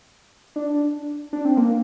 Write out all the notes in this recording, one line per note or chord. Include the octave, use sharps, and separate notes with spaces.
D4
D4
C4
A#3